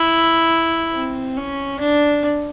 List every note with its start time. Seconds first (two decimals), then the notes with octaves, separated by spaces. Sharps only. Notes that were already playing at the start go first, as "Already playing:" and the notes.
Already playing: E4
0.93 C4
1.37 C#4
1.80 D4